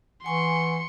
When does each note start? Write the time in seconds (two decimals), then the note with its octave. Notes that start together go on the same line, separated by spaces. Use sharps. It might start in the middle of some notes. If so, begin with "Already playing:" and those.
0.24 E3 F#5 G#5 C6 C#6 C#7